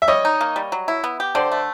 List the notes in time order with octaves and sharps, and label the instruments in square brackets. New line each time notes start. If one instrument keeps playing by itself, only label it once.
[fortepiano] E5
[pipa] G3 [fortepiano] C#5 D#5
[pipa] D#4
A#3
G3
F#3
E4
B3
G4
[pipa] D3 [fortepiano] C5 D5
[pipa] A3